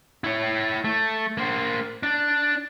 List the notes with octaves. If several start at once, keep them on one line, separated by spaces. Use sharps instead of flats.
E4 C#5
A3
A#3 C5
D4